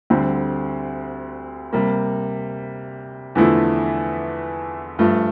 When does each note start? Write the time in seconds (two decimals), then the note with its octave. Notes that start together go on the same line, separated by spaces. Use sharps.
0.10 D2 D3 G3 C4
1.73 C3 G3 A#3
3.35 E2 D3 F3 A3 E4
4.99 G2 F3 A3